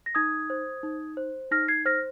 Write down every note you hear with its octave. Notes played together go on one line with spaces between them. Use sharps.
A#6
D#4 D#6 G#6
C5
D#4
C5
D#4 F6 A#6
G#6 C7
C5 F6 A#6